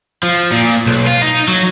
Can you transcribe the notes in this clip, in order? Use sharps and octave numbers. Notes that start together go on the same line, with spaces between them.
F3
A#2
B1
F4
D#4
F#3